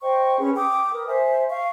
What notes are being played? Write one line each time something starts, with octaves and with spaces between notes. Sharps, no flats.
C5 D#5 G5 C#6
C#4 G#4 B4
G5 D6 D#6
A#4 B4 D#6
C5 E5 G#5
F5 C#6